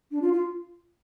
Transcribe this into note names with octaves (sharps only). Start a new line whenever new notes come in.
D4
F4
F4